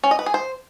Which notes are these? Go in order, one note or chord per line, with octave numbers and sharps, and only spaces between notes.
C#4
D#5
B4
G#4
C5